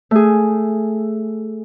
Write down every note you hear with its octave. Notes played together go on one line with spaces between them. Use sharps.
A3 G#4